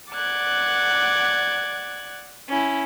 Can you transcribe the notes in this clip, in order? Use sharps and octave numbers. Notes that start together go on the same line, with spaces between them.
D5 F#5 D6 F#6 G#6
C#4 E4